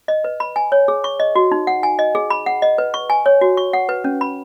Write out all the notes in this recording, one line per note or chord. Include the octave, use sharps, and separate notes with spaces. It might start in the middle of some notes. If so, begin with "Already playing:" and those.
D#5
B4
B5
G#5
C#5
G#4
C#6
D#5
F#4
D#4
F#5
G#5
D#5
G#4
B5
F#5
D#5
B4
C#6
G#5
C#5
F#4
C#6
F#5
B4
C#4
B5